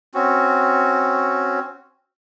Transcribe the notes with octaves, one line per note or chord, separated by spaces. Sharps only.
C4 C#4 F#4